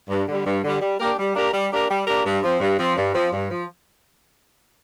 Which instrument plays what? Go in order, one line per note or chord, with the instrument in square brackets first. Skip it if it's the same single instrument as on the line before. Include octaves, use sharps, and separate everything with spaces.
[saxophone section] G2
D3 G3
G2
D3 G3
G3
A#3 D4 G4 A#4
G3
A#3 D4 G4 A#4
G3
A#3 D4 G4 A#4
G3
A#3 D4 G4 A#4
G2
F3 C4
G2
F3 C4
G2
F3 C4
G2
F3